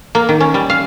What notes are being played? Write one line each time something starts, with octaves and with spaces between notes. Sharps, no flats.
A#3
D#3
C#4
G3
F5